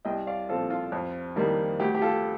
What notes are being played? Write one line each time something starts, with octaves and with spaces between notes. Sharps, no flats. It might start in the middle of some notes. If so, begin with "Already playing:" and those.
C2 D#5 G5
D5 F5
A#2 F3 C4 F4 A4
F4
F2
D#3 G3 A#3
D2 G4
G4
F4 A4